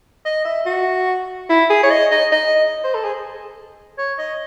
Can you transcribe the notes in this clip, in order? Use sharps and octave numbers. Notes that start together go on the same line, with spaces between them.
D#5
E5
F#4
E4
G#4
C#5
D#5
D#5
D#5
C5
A4
G#4
C#5
D#5